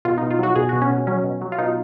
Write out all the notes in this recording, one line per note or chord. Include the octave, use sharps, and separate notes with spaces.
B2 F4
D#4
B2
F4
F#3 F#4
B2 G#4
F#4
B2
C#4
B2
F#3 C#4
B2
F#3
F4
B2 D#4